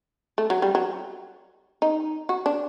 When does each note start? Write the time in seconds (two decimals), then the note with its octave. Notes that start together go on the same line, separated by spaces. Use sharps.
0.38 A3
0.50 F#3
0.62 G3
0.75 F#3
1.82 D#4
2.29 F#4
2.46 D4